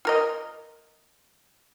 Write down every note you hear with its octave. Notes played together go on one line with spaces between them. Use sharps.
F4 A#4 D#5